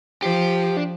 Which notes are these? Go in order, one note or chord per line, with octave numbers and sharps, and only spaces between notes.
F3 G4
D4